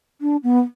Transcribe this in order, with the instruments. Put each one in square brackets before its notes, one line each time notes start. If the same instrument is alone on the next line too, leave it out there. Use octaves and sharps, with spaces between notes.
[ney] D4
B3